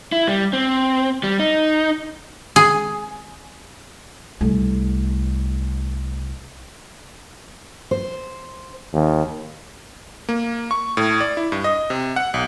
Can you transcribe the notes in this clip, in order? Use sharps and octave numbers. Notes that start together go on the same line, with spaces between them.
E4
G3
C4
G3
D#4
G#4
C2 A3
C5
D#2
A#3
C#6
A2
D5
E4
G2
D#5
C3
F#5
B1